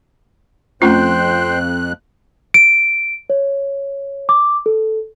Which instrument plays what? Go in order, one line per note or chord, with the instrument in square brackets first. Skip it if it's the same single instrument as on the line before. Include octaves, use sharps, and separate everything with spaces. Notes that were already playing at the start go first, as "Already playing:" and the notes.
[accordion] F2 F#6 [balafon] A3 C#4 F4 [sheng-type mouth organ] C5 G5 C6
[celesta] D7
C#5
D6
A4